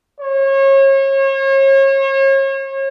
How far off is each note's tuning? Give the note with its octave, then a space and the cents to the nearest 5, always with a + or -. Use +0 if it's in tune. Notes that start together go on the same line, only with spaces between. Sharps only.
C#5 -35